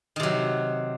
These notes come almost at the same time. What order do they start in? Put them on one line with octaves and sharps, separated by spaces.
D#3 C3 F#3